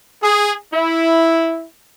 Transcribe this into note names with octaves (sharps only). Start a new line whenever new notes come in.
G#4
E4